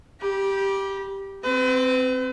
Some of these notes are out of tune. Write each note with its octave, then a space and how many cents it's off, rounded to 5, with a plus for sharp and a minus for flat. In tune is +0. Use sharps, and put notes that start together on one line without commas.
G4 +0 B5 -35
C4 +0 B4 +45